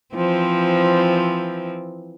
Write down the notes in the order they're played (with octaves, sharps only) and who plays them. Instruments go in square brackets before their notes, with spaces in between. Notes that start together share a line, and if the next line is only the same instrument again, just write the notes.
[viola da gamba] E3 F3 C4